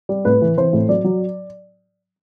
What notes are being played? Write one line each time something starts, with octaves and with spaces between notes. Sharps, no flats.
G3
A2 B4
E3
E3 C5
A2
F#3 D5
F#3